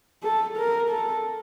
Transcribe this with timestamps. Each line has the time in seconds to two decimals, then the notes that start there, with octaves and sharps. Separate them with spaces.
0.23 A4
0.57 A#4
0.89 A4